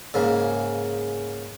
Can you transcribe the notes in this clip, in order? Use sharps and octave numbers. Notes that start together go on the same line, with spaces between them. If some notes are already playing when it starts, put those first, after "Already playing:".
G#2 C#3 A#3